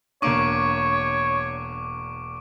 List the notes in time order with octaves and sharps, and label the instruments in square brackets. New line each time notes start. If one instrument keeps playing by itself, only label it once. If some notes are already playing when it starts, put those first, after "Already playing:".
[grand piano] E1 A#3 D4 [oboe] C#5 [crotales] C#6 D6 D7